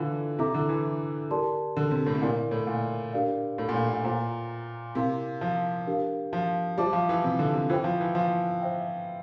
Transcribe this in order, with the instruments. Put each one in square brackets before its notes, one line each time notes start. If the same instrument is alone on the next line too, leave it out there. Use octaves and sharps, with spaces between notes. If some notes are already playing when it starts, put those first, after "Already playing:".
Already playing: [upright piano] D3 E3 [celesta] F4 A4 D5 F5
[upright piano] C3 [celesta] E4 A4 E5 A#5 D6
[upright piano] D3
E3
[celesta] G4 A#4 D5 A5 C6
[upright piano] D3
C3
A2
C3
[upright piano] A#2 [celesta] E4 A#4 D5
[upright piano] A2
A#2
[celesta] D4 G4 A#4 D5 F5
[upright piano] A2
A#2
A2
A#2
[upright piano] A#2 [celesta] F4 C5 G5 A#5 D6
[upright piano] C3 [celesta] E4 A#4 F5 C6
[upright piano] F3
[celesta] D4 G4 A#4 F5
[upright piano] F3
[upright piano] G3 [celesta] F4 C5 E5 A5 D6
[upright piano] F3
E3
C3
D3
C3
[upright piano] E3 [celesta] F4 C5 G5
[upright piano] F3
E3
F3
[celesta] C5 E5 G5